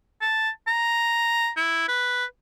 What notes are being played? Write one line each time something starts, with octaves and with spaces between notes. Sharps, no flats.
A5
A#5
E4
B4